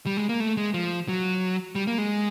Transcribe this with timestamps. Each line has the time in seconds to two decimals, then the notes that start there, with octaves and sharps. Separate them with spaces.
0.06 G3
0.17 G#3
0.29 A#3
0.40 A3
0.57 G#3
0.74 F3
1.08 F#3
1.75 G3
1.87 A#3
1.98 G#3